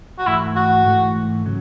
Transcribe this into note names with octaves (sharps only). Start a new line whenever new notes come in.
F#4
G#2 E3 A3 E4
F#4
G#2 E3 A3
C#3 F#3